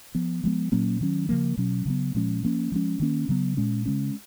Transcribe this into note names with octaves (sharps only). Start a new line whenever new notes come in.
F3 B3
F3 G#3 B3
A#2 F#3 A#3 C#4
D#3 F#3 C#4
C#3 F3 A#3
B2 F#3 C#4
C#3 F#3 B3
A#2 F3 G#3 C#4
F3 A#3 C#4
F3 G#3 C#4
D#3 A#3 C#4
C#3 F#3 B3
A#2 G#3 C#4
C#3 G#3 C#4